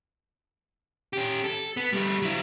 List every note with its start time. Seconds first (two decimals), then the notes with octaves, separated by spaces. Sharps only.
1.13 C#4 G4
1.44 A4
1.77 B3
1.93 G3 A3
2.22 F#3 E4